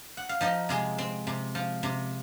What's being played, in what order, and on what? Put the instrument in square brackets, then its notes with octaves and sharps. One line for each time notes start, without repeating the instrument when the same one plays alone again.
[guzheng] F#5
F5
F3 D#4 D#5
C3 G#3 G#4
C4
C3
F3
C3